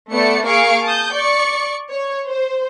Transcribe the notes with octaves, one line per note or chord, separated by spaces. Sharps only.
A3 B3 D5 C#7
A#3 G#4 F5 C#6 C7 D7
A5 D#6 G6
D5 C#6 C#7
C#5
C5